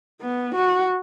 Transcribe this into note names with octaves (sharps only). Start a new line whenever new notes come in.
B3
F#4